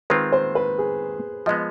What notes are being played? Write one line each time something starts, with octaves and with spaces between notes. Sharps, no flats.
D#3 G#3 C4 F4 B4
C5
B4
G#4
F3 G#3 B3 D#5